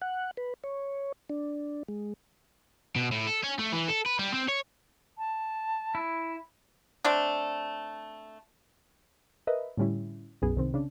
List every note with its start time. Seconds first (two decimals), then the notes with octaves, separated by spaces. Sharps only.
0.02 F#5
0.37 B4
0.64 C#5
1.30 D4
1.88 G#3
2.96 B2
3.12 A2
3.27 A4
3.43 C#4
3.59 A3
3.72 E3
3.88 A4
4.06 B4
4.19 G3
4.34 C4
4.48 C#5
5.18 A5
5.95 E4
7.05 A3 C4 D4
9.47 A#4 B4 D#5 E5
9.77 A2 D3 G3 C#4 E4
10.42 B1 F#2 B3 G#4
10.56 C2 C3 D#3 C4
10.74 C#3 D4